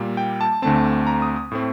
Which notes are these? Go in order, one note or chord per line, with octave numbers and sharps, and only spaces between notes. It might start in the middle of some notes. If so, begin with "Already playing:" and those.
Already playing: A#2 G3 A#3
G5
A5
D2 D3 A3 C4 A5
A#5
D#6
D#6
A2 A3 C4